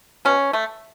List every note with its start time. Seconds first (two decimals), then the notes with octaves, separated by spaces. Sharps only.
0.25 B2 C#4
0.53 A3